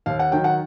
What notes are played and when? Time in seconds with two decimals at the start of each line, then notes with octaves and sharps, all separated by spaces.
0.06 D#2 F5
0.19 F#5
0.31 D#3 F#3 G5
0.44 F#5